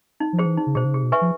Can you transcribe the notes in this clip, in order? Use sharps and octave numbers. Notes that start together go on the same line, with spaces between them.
D#4
F3
G#4 C5
E3
D#4
C#3
B2 G#4 C5
C#3
C3 G#4
B2
B4 E5 G#5 C#6
F3